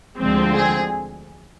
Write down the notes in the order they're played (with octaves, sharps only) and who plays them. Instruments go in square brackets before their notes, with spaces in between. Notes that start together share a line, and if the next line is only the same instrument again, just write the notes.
[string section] D2 D3 F3 G#3 C4
G#4